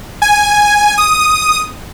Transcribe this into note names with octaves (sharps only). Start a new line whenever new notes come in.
G#5
D#6